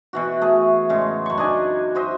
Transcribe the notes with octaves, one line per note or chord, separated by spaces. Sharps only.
B2 E3 F#4
A3 G#4
A2 C#3 G#3
F#2 C#6
D4 D#4 D#5 G#5
F#4 C5 D#5 E5